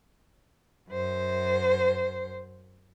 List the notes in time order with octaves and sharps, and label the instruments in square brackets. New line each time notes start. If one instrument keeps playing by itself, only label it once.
[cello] F#2 C5